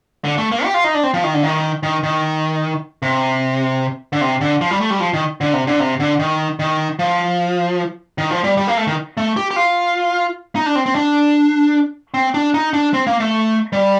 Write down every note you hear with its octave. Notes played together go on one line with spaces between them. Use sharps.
D3
A3
A#3
G4
F4
D#4
D4
C4
F3
D#3
D3
D#3
D#3
D#3
C3
D3
C3
D3
F3
G3
A3
G3
F3
D#3
D3
C3
D3
C3
D3
D#3
D#3
F3
D#3
F3
G3
G3
A#3
A3
D#3
A3
G4
G4
F4
D#4
D4
C4
C4
D4
C4
D4
D#4
D4
C4
A#3
A3
G3